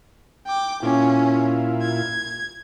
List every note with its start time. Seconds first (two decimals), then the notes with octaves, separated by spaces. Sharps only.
0.46 G5 D6
0.83 A#2 C#4 E4 F4
1.81 G#6